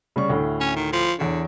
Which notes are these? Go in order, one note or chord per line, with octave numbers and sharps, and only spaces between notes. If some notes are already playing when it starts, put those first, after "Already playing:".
C#3 G3 C#6
D2 A2
C#4
D#3
F3
E2 D3 C#5